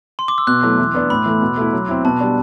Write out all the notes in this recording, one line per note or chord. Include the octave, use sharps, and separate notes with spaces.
C6
D6
E6
B2 F#6
F#3 A3 E4
E3
B3 D4
A2 B5
E3 A3
B2
A3 E4
F#3
C4 E4
B2 A5
G3 D4